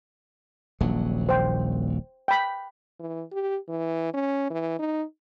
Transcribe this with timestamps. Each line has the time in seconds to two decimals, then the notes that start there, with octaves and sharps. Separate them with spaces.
0.80 D#1 A#1 F#3
1.29 C5 G5
2.28 G5 B5
3.00 E3
3.32 G4
3.69 E3
4.14 C#4
4.51 E3
4.79 D#4